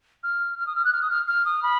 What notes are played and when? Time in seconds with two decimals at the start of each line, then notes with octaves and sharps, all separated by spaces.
0.23 F6
0.58 F6
0.67 D#6
0.76 F6
0.85 F#6
0.93 F6
1.02 D#6
1.10 F6
1.28 F6
1.45 D#6
1.63 B5